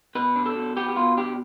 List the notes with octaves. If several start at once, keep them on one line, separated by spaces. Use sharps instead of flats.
B2 B4
D4
A4
B2
B3 G4
G4
B2 F4
D4 G4